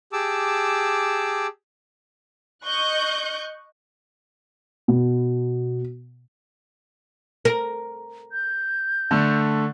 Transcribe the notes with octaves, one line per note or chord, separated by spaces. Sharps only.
G4 G#4 A5 D6 E6
D#5 C#6 F#6 G6
B2
A#4
G6
D3 A3